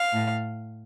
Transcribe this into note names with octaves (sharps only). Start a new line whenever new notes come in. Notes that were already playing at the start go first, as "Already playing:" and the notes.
Already playing: F5
A2